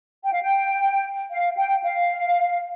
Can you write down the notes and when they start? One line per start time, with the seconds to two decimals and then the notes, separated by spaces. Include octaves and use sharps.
0.24 G5
0.32 F5
0.42 G5
1.31 F5
1.57 G5
1.83 F5